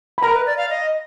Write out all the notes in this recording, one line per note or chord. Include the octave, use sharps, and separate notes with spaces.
B5
A#4 A#5
B4
D5
F5
D#5